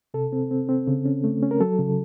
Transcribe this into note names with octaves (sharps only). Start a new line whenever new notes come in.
C3 A4
C4
C4
C4
C#3
C#4
A3
C#4
A#4
F#3 A4
C#3